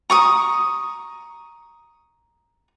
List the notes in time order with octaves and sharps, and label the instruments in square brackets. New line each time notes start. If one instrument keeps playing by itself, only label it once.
[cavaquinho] A#5 C#6 D#6